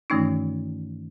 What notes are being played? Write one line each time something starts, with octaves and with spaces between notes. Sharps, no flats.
G2 D#3 E3 A3 C#4 D#4